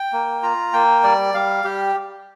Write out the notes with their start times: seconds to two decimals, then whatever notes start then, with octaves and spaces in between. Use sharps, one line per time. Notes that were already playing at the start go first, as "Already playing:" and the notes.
Already playing: G5
0.13 A#3
0.43 F4 A#5
0.73 A#3 G5
1.04 G3 D5
1.34 G3 F5
1.64 G3 G4